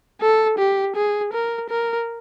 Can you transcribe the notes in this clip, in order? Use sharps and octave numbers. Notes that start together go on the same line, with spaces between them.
A4
G4
G#4
A#4
A#4